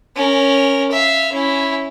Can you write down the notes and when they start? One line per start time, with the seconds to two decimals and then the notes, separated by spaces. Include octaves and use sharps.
0.16 C#4 A#4
0.92 E5 F5
1.33 C#4 E4